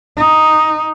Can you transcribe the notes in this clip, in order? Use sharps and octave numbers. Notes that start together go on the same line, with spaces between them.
D#4